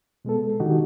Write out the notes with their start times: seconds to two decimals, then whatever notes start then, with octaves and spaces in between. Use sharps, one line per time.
0.25 B2 G#3 B3 A4
0.60 D3 D#3 D#4 F#4 G4